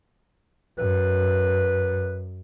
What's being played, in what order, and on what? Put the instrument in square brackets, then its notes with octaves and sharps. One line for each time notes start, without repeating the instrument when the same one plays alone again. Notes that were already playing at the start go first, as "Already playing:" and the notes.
[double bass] F#2 [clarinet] B4